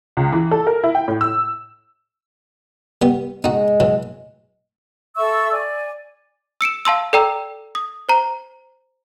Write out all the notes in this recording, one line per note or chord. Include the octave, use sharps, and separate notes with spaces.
C#2
E3
A4
A#4
E4
G5
A2
E6
G3 B3
G#3 D#4 F#4
E3 F#3
A4 E5 C#6 E6
D5 G#5
E6 C#7 D7 E7
F5 A5 C6 E6
A4 D5 G5 A#5 E6
D#6
C5 A#5